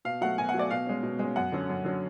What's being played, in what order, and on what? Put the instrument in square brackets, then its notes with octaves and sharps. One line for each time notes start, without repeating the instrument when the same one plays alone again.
[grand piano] B2 F5
F#3 A3 F#5
B2 G#5
F#5
F#3 A3 D5
B2 F5
G#3 C#4
B2
G#3 C#4
F#2 F#5
D3 F#3 C#4
F#2
D3 F#3 C#4